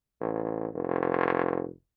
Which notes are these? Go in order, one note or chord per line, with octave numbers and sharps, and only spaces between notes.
A1
F1